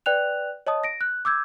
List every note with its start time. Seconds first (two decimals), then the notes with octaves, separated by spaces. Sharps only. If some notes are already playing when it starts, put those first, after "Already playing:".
0.06 B4 D5 G5 F#6 F7
0.67 C#5 D#5 A5 D#6
0.84 A#6 D7
1.01 F#6
1.25 D6 E6 G6 G#6